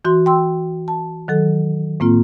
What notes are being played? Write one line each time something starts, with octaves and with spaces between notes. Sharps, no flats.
E3 F#4 C6
G5 C6 E6
A5
D#3 F#3 A4
A2 A#3 C4 F4